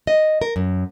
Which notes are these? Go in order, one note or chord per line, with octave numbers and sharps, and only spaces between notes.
D#5
A#4
F#2